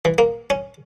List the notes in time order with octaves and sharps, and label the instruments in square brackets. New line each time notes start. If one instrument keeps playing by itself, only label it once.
[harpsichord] E3
A#3
C#4